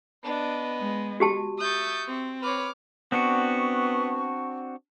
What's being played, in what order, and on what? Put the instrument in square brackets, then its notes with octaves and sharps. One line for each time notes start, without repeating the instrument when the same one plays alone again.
[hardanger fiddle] B3 D#5 [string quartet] D4
[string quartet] G#3
[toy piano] F#4 G4 A5
[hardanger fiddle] E5 C#6 [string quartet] D#6 G6 A6
[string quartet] C4
[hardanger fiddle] B4 C#5 [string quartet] D6 F6
[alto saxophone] B3 [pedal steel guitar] C4 D4 F#4 [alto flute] C#6